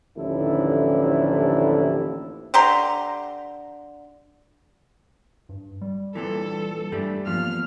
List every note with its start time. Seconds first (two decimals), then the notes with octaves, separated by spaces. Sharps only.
0.17 A1 D#2 D3 F3 E4 A4
2.54 D3 G4 A#5 C6
5.49 G2
5.81 G3
6.15 G2 A#2 E3 A4
6.92 G2 G3 A3 D4
7.27 E2 F3 A#3 F6